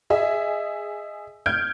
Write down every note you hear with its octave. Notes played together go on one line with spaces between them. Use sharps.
G#4 D#5 E5
F6 G6 G#6 D7